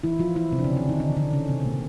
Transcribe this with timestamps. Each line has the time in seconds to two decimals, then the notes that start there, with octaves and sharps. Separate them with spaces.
0.04 E3 E4
0.19 F3 F4
0.36 E3 E4
0.52 C3 C4
0.58 D4
0.64 C#3 C#4
0.76 D3 D4
0.89 D#3 D#4
1.00 D3 D4
1.17 D3 D4
1.33 C#3 C#4
1.49 C3 C4
1.65 A#2 A#3